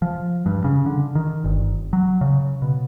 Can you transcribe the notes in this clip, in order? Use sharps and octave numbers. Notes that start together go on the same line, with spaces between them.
F3
G2
C#3
D3
D#3
G1
F#3
C#3
B2